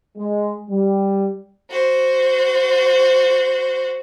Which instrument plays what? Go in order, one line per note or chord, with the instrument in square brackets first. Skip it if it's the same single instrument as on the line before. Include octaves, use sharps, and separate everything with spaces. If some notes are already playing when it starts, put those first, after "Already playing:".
[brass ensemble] G#3
G3
[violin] F#4 C5